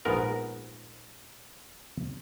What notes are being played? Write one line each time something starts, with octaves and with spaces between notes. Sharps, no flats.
A#1 G#2 G#3 B3 A#4 A#5